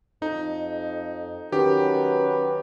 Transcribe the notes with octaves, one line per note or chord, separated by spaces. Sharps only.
F2 D#4
D#3 F#3 C#4 G4 B4